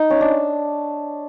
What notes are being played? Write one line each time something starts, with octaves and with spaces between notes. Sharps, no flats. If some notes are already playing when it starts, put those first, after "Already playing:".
Already playing: D#4
C#4
D4